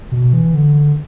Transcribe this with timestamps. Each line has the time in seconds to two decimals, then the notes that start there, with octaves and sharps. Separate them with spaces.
0.12 B2
0.33 E3
0.54 D3